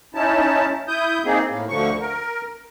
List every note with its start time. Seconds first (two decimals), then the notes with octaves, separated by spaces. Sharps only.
0.15 C#4 D#4 E4 A5
0.88 E4 D#6 G6
1.25 A#3 C4 D#4 G#4
1.48 A2 A#3
1.69 D2 D3 F3 C#6
2.00 A#4